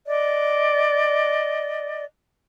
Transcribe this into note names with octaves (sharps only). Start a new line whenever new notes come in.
D5 D#5